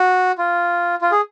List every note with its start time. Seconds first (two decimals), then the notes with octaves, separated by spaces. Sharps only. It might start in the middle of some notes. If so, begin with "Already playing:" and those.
Already playing: F#4
0.38 F4
1.02 F4
1.12 G#4